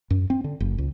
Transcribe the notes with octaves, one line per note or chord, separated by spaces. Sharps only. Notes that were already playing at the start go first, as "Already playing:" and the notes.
F#2
C4
D3
F#1
C#2